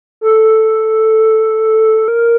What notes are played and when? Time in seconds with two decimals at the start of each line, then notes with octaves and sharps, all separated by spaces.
0.21 A4
2.08 A#4